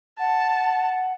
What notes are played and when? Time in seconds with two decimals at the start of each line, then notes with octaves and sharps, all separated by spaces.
0.19 F#5 A5